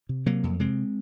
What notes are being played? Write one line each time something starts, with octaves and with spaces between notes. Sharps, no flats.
C3
C3 F#3 A#3
F2
C3 G#3 C4